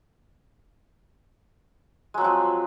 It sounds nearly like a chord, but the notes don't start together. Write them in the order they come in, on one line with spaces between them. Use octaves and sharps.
G#3 F#3 C4 F3